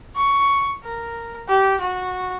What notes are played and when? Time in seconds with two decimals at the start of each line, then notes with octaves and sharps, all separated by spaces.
0.16 C#6
0.84 A#4
1.48 G4
1.81 F#4